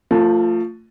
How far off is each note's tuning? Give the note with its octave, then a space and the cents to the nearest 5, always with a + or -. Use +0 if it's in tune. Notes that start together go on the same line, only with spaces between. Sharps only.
F3 +0 A3 +30